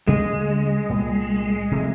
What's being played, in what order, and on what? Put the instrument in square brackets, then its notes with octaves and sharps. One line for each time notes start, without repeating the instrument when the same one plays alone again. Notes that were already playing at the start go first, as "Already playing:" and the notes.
[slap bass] D2 C#3 F#3 A#3 [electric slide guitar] G#3
[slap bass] C2 A#2 G3 A#3
C3 F3 A3